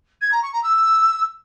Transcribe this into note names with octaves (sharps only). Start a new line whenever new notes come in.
G#6
A#5
C#6
A#5
E6